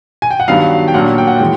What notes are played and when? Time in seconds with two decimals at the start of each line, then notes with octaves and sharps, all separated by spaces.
0.22 G#5
0.31 G5
0.40 F#5
0.48 G2 D#3 F#3 B3 F5
0.88 G5
0.94 A#2 F#3 A#3 D4 F#5
1.18 G5
1.28 F#5
1.38 E3 G#3 G5